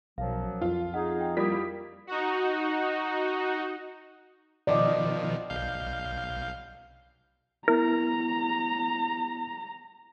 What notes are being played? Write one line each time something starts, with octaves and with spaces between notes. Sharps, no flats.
B1 F#2 F3 F#3 F5
F2 F4
D#4 G#4 F#5
G5
G3 A#3 E4 F4 D#6 B6
D#4 F#4
B2 D#3 F3 D5 D#5
B1 F5 G6
B3 E4 A#4 A#5